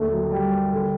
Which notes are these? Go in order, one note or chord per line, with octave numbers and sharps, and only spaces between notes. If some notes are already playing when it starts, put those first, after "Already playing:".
Already playing: D#2 D3 A3
F#3
G3
D3